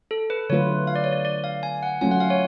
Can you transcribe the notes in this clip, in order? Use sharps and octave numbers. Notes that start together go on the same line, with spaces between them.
A4
B4
D3 F#3 A3 F4 B4 C#5
F5
D5
C#5
D5
D5
F5
G#5
F#5
F#3 A3 C#4 F4 G#5
F#5
F5
C#5